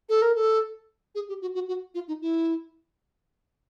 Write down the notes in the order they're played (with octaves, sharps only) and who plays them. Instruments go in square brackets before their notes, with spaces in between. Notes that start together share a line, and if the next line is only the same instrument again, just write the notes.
[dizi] A4
A#4
A4
G#4
G4
F#4
F#4
F#4
F4
D#4
E4